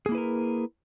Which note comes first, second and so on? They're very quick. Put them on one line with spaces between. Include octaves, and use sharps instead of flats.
G#4 A#3 E4 B4 A#4